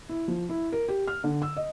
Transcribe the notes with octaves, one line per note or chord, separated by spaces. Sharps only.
E4
F3
E4
A#4
G4
F6
D3
E6
D#5